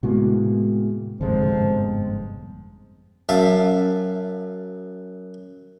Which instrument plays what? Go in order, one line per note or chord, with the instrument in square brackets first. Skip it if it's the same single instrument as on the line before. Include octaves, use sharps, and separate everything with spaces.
[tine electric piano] A2 B3 F#4 [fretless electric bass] C3 G#3 A#3
[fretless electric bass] G1 C3 G#3 [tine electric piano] F2 G#2 [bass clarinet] F3
[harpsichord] F#2 E5 F5 A5